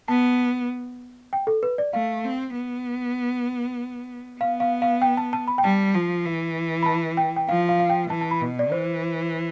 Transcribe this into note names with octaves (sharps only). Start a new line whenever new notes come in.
B3 A5
G5
A4
B4
D5
A3 F5
C4
B3
B3 F5
F5
F5
G5
A5
A5
B5
G5
G3 A5
F3
E3
B5
A5
G5
G5
F3 F5
F5
F5
G5
E3 A5
A5
B5
B2
D5
E3 C5